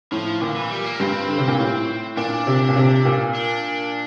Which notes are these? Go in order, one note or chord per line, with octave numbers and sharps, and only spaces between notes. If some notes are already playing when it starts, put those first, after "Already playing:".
A2 F3
A#2 D3
E3
G3
A#3
G2 C4
D3
C3
A#2
A2
A#2 D4
C3
A#2
C3
A#2
D4